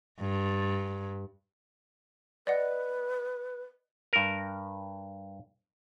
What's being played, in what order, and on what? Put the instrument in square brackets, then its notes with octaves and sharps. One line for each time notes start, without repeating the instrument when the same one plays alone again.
[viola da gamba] G2
[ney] B4 [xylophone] D5 D#5 F#5
[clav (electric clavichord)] G2 A#4